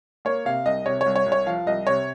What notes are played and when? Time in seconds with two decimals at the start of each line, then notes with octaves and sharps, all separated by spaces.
0.25 A#3 C#5
0.45 C3 F5
0.65 C2 D#5
0.86 C3 C#5
1.01 C#5
1.06 C2
1.16 C#5
1.26 C2
1.32 C#5
1.46 F3 F5
1.67 C2 D#5
1.87 C3 C#5